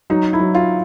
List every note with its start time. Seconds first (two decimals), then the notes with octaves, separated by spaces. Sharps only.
0.10 F#3 D#4
0.33 E4
0.39 F#3
0.54 F4